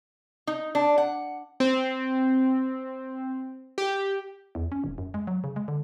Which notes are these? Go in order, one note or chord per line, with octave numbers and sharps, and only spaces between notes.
D#4
D4
F#5
C4
G4
E2
C#4
D#1
F#2
G#3
F#3
C#3
G#3
D3